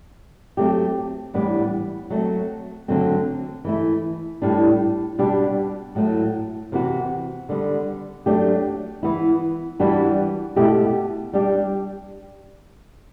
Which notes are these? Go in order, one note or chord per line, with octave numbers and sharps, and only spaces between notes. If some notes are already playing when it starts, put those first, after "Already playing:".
F#3 A3 C4 G4
A2 E3 G3 B3 D4
F#3 A3 C4
D3 F#3 A3 C4
E3 A3 E4
A2 G3 D4
B2 G3 D4 G4
A2 F#3 A3
C3 E3 B3 F#4
D3 G3 B3
F#3 A3 D4 G4
E3 B3 E4
E3 G3 D4 F#4
B2 A3 E4 G4
G3 D4 G4